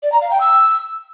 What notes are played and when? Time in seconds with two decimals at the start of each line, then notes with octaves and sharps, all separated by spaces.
0.03 D5
0.12 A#5
0.22 F5
0.31 G5
0.41 E6